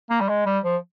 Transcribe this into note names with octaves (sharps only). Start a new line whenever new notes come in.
A#3
G3
G#3
G3
F3